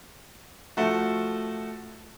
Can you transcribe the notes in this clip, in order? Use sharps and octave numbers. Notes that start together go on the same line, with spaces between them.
F3 A3 F#4